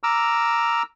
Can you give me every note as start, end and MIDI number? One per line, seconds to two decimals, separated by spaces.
0.03 0.83 82
0.03 0.83 86
0.03 0.83 88
0.03 0.83 89